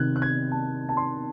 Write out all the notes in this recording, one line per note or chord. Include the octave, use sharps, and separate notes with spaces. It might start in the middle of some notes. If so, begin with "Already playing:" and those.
Already playing: C3 D#3 F#6 G#6
F#6
G#6
A5
A5
C6